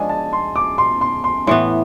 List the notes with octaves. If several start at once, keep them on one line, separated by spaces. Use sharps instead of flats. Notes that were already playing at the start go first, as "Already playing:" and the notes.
Already playing: F3 G#3 D4 G#5
A5
C6
D6
C6
C6
C6
A2 E3 B3 C6